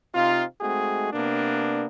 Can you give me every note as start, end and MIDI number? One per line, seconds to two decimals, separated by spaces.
0.15 0.44 48
0.15 0.44 60
0.15 0.44 63
0.15 0.44 65
0.61 1.09 56
0.61 1.09 57
0.61 1.09 60
0.61 1.09 63
0.61 1.09 66
0.61 1.09 68
1.13 1.87 48
1.13 1.87 58
1.13 1.87 59
1.13 1.87 62